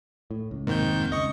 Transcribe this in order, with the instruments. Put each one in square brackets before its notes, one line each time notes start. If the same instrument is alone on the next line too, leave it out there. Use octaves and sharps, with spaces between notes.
[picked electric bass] A2
C#2
[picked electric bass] F1 C3 A#3 [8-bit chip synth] G#2 D#3 G6
[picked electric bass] C#2 [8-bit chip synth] D#5 C#6